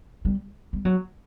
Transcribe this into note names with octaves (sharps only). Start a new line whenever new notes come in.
G3
G3
F#3